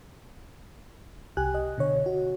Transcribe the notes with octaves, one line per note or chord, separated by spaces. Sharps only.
C2 G4 G#5 F#6
D#5
B2 D3 C#5
F#4